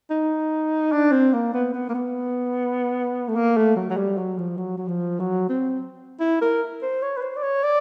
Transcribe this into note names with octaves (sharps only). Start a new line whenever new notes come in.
D#4
D4
C4
A#3
B3
B3
A#3
B3
A3
A#3
A3
F#3
F#3
G3
F#3
F3
F#3
F#3
F3
F#3
C4
E4
A#4
C5
C#5
B4
C5
D5
C#5
D5